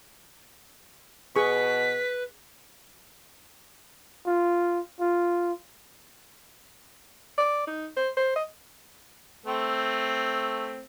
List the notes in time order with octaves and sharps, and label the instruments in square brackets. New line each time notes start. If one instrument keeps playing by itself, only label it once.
[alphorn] B2 [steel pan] G#4 C#6 [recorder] B4 [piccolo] B6
[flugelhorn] F4
F4
[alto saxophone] D5
D#4
C5
C5
D#5
[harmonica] A3 C4